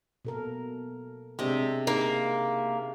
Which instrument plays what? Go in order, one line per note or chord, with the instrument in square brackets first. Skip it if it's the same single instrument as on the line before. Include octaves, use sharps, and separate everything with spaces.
[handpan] B2 A4 A#4
[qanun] C3 D#5 [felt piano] G#3 C4 D4
[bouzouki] A#3 [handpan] D#4 G#4